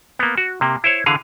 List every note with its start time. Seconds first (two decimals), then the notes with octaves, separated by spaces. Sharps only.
0.19 A#3 B3
0.38 F#4
0.61 C3 A#3
0.84 E4 C5 C#5
1.06 D3 E3 G#4 F5